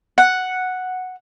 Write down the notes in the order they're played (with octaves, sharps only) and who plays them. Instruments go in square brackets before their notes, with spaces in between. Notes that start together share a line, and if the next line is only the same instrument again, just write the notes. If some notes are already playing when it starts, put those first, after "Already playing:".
[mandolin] F#5